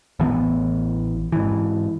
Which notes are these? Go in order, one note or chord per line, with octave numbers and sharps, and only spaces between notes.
A1 E3 B3
G#2 E3